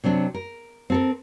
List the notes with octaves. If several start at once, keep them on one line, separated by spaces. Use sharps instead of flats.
C3 F#3 C4 D4
A#4
C4 A4 A#4